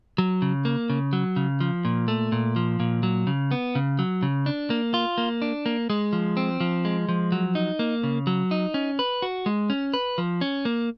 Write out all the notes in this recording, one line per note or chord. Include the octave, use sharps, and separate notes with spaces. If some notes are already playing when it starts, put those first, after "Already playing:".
F#3
C#3
A#3
C#3
F#3
C#3
F3
A#2
A3
A#2
F3
A#2
F#3
C#3
B3
C#3
F#3
C#3
D4
A#3
F4
A#3
D4
A#3
G#3
F3
C4
F3
G#3
F3
F#3
D#4
A#3
C#3
F#3
D#4
C#4
B4
F#4
G#3
C#4
B4
F3
C#4
A#3